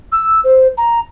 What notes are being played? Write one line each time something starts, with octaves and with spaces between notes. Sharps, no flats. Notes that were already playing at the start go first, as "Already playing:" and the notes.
E6
C5
A#5